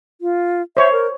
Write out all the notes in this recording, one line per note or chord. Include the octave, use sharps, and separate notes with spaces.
F4
C5 C#5 E5
A#4